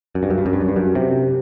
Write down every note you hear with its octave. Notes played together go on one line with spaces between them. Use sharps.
F#2
G2
F#2
G2
F#2
G2
F#2
G2
F#2
C3